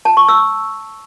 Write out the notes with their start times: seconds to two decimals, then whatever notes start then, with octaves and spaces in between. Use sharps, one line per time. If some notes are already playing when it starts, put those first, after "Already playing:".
0.05 A5
0.17 C#6
0.28 E6